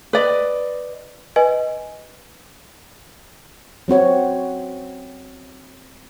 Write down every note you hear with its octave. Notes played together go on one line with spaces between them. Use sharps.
B4 D5 D#5
B4 D#5 G#5
F#3 C4 F#4 C#5